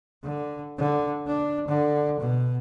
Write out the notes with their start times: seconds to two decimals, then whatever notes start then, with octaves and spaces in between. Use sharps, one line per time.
0.23 D3
0.78 D3
1.27 D4
1.68 D3
2.20 B2